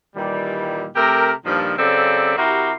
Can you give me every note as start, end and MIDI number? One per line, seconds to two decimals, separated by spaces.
0.15 0.88 46
0.15 0.88 51
0.15 0.88 52
0.15 0.88 55
0.95 1.32 48
0.95 1.32 57
0.95 1.32 67
0.95 1.32 70
1.45 1.73 43
1.45 1.73 46
1.45 1.73 51
1.45 1.73 53
1.78 2.34 42
1.78 2.34 49
1.78 2.34 60
1.78 2.34 69
1.78 2.34 74
1.78 2.34 76
2.37 2.73 48
2.37 2.73 64
2.37 2.73 66
2.37 2.73 67
2.37 2.73 70
2.37 2.73 84